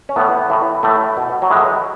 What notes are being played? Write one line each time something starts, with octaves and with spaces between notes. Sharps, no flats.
C#4
A2 E3 B3
A2 E3
A2 E3 A3
B2
F#3
A2 E3 G#3